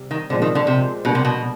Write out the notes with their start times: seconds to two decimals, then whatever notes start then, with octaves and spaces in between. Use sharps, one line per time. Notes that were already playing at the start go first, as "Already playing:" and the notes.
Already playing: C3 G3
0.11 D#3
0.30 A#2 D3 F3 G#3 C4
0.42 D#3
0.55 D3
0.67 C3
1.05 B2 D3 G3 A#3
1.15 C3
1.25 B2